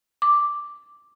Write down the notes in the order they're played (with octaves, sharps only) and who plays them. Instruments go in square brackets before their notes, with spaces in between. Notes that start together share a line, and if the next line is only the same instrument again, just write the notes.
[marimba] D6